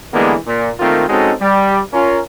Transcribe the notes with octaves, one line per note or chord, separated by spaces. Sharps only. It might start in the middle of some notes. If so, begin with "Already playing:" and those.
D3 E3 G3 G#3 A#3 B3
A#2
D#3 A3 A#3 C4 F4 A#4
G#3 C4 C#4 D#4 F#4 A4
G3
C#4 F4 A#4